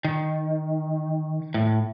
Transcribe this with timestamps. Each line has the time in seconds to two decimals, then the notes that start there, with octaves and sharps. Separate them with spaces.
0.05 D#3
1.54 A2